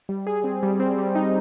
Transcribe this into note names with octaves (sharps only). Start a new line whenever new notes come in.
G3
G#4
C4
G3
C4
G3
D#4